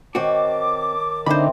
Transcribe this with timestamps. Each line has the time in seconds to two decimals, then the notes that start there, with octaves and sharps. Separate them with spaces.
0.15 D#3 C4 F#4 C#5 A5 D6
1.26 D3 C4 D#4 E4 C5 B5